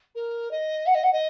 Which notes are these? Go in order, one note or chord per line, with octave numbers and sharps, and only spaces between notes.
A#4
D#5
F#5
D#5
F#5
D#5